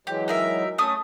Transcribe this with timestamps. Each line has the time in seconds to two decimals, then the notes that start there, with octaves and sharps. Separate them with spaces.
0.07 E3 F#3 G#3 G4
0.28 D#4 A#4 E5
0.78 A3 C#4 D#6